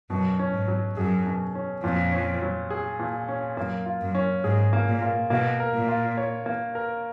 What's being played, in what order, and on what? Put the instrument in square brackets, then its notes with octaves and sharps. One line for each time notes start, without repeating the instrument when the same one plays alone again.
[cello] F#2 [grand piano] B2
[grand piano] C#4
[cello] G#2
[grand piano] F#3
[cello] F#2 [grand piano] G#4
[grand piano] B2
C#4
[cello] F2 [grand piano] A#2
[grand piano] C#4
F#3
G#4
A#2
C#4
[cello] F#2 [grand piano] A#3
[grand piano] F4
[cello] F#2
[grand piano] C#4
[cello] G#2 [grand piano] G#4
[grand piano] A#3
[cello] A#2
[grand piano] F4
[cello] B2 [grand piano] A#3
[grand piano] A#4
[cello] A#2
[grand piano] F4
C#5
A#3
A#4